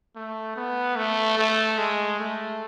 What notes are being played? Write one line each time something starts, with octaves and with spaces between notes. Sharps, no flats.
A3
B3
A3
A3
G#3
A3